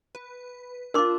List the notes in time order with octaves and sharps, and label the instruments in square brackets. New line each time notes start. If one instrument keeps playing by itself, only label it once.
[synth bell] B4
[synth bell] D4 F4 [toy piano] A#4 C6 D6